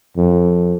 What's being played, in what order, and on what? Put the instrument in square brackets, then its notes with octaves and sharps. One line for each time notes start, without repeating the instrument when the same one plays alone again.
[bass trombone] F2